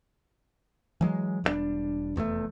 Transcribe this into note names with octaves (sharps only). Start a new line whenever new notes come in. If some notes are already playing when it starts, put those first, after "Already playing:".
E3 F#3 G#3
E1 G2 G3 D4
F1 E2 A2 A3